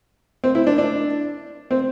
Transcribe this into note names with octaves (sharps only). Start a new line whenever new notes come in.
C4
E4
D4
D4
C4